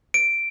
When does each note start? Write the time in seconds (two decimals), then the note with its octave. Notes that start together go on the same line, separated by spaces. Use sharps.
0.14 D7